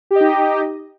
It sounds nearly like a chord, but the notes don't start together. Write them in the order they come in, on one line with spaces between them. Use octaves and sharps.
G4 D#5 D#4